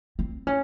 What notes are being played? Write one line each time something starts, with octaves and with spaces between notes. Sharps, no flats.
C4
C#4